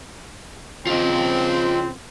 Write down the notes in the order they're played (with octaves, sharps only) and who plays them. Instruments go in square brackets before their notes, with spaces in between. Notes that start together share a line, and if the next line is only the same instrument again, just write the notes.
[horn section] C#3 F3 C4 [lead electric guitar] F4 D#5